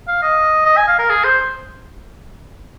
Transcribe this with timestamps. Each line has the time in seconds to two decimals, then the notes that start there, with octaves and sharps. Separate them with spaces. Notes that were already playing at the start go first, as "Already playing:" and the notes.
0.08 F5
0.22 D#5
0.66 D#5
0.77 G#5
0.88 F5
0.99 A#4
1.10 G#4
1.24 C5